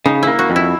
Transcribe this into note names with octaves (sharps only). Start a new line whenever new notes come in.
C#3 D#4
A#3 E4
F#4
F2
E4